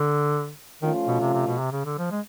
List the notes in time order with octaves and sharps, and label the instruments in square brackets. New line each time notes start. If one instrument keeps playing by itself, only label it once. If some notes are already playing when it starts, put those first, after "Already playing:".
Already playing: [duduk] D3
[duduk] D#3 [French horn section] F3 A3 C#4 F4
[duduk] B2
C3
C3
B2
C3
C#3
D3
F3
G#3